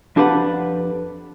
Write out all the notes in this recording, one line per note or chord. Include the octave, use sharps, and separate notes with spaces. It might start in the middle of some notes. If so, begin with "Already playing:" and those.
F2 D4 G4 A4 B4 F#5